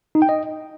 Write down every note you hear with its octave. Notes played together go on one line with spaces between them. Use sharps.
D#4
G5
D#5